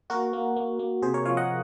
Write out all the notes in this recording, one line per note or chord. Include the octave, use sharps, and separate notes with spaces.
A#3 F#4 A#4
A#3
A#3
A#3
C3 G#4 C5
A#4 C#5
F3 C#5 F5
D#5 F#5